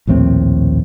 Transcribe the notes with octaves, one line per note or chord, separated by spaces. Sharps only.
A#1 D#2 A2 C4